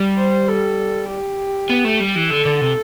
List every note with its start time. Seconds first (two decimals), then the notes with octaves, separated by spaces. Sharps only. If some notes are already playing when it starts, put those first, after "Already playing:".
Already playing: G3
0.18 C5
0.48 A4
1.08 G4
1.70 B3
1.84 A3
2.00 G3
2.15 E3
2.31 D3 A4
2.45 D3
2.61 C3